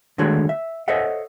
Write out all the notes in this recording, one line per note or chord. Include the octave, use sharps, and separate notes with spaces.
D3 D#3 G#3 A3 F#4 C#5
E5
A4 C5 C#5 D#5 E5 F#5